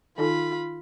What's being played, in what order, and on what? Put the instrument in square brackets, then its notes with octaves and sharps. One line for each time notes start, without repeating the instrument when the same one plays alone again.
[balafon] D#3 D#4 A4 [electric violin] F4 B5